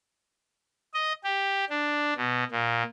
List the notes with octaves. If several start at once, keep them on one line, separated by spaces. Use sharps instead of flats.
D#5
G4
D4
B2
A#2